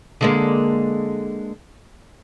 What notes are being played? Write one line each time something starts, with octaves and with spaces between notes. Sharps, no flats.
D3 G#3 A#3